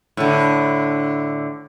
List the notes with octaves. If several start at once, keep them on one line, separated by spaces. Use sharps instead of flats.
A2 D3